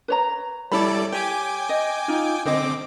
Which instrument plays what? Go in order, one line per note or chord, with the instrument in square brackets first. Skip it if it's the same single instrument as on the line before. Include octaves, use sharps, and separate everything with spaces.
[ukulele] B4 C#5 A#5
[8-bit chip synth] G3 A4 D5 [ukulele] E4 C#5 B5
[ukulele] G4 C#5 [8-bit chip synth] G5 G#5 D6
[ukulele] D#5
D#4 F4
[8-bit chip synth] D3 C4 D6 [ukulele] C5 D#5